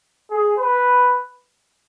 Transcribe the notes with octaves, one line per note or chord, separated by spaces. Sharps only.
G#4
B4